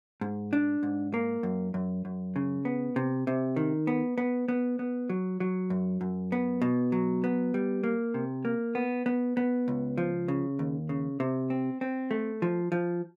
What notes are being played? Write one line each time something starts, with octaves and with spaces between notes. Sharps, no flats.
G#2
D4
G#2
A#3
F#2
F#2
F#2
C#3
B3
C3
C3
D#3
B3
B3
B3
B3
F#3
F#3
F#2
F#2
B3
B2
F#3
B3
G3
A#3
C3
A#3
B3
B3
B3
C#2
F3
C#3
D#2
C#3
C3
C4
C4
A3
F3
F3